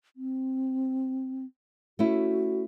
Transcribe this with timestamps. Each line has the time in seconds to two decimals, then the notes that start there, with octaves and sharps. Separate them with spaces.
0.16 C4
1.99 A3 C#4 E4 F#4